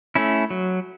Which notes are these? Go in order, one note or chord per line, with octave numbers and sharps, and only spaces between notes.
A3 C#4 E4
F#3